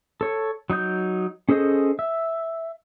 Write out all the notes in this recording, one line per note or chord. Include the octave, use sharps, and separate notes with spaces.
A4 C#5
F#3 D#4 D#6 G6
C#4 G#4 A4 C5 D#5
E5